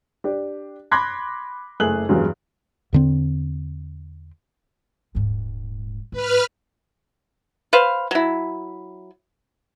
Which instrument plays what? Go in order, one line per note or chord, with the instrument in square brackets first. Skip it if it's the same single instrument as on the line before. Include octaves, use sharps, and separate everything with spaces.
[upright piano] D4 G4
B5 C6 D6 F#6 G#6 A#6
F#1 A3 G#4 F#6 F#7
E2 G2 F#3 G#3
[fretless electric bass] E2 D3 C4
[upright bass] D#1 G#2
[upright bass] G#2 [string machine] B4 F6
[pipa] B4 C5 F5
F#3 E4